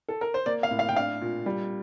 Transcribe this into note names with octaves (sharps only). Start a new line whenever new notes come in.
A4
A#4
C5
A#3 D5
F5
A2
F5
G5
D4 F5
A#2
G3